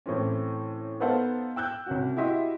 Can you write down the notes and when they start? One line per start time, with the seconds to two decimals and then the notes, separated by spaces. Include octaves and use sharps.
0.06 A2 E3 C4 C#4
1.00 B3 D#4 A4 C5 F5 F#5
1.56 G5 E6 F#6 G6
1.86 C2 C#4 F#4
2.17 E4 F#4 G4 D#5 E5 C6